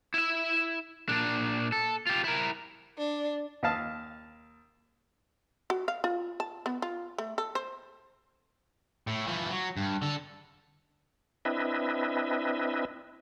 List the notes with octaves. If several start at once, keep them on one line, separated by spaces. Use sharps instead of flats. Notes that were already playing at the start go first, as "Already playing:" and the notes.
E4 E5
A#2 D4
A4
F4 G4
E4 A#4
D4
D#2 D#5 F5 A5
F#4
F5
F4
A5
B3
F4
A3
A4
C5
A2
E3 F3
F#3
G2
D3 A4
C4 D4 E4 B4 D#5 E5